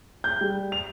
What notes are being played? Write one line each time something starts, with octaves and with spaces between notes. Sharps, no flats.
G6
G3
F7